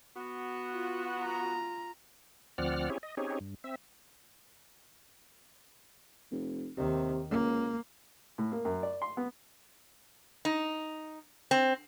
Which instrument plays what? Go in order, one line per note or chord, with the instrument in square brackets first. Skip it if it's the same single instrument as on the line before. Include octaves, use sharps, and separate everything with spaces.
[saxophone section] B3 F#4
[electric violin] F4
F4 A#5
[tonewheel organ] D2 F3 C4 D5 F#5 F6
C4 C#4 E4 G4 G#4 C#5
D#5
C4 C#4 D#4 G4 G#4 C#5
G2
C4 E5
[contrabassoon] F1
[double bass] D#2 D#3 [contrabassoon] C3
[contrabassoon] C#2 [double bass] A#3
[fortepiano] A2
A#3
F#2
D5
C6
B3
[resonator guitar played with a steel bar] D#4
C4